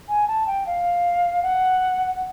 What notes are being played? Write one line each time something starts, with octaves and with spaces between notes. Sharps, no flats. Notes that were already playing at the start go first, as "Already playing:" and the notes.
G#5
A5
G5
F5
F#5